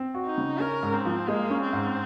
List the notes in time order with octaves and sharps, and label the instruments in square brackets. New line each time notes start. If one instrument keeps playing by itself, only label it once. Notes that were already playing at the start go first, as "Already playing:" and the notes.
Already playing: [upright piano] C4
F#4
[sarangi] D#4
[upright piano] C#3
[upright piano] C#4 [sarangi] A#4
[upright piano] G#2
[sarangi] C4
[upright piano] F3
[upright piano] G#3 [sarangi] A#3
[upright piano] C#4
[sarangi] C4
[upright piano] G#2